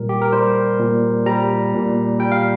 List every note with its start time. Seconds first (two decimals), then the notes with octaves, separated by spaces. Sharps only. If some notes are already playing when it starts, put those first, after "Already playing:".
Already playing: A#2 G3 A#4
0.09 G4
0.22 A#4
0.33 G3 C5
0.79 A#2
1.26 G3 A#5
1.74 A#2
2.19 G3 G5
2.32 F5